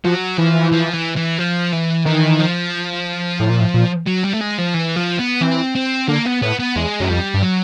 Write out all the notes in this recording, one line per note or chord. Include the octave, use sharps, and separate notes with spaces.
F3 F#3
E3 F3
F3
E3
E3
F3
E3
D#3 E3
F3
A2
A#2
A2
A#2
F#3
G3
A3
G#3
F3
E3
F3
B3
E3 C4
C4
D3 A#3
B3
A2 B3
B3
E2 G#3
F#2 F#3
F2 G3
G2
F#3